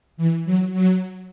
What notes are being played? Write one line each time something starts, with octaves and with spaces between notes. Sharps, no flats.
E3
F#3
F#3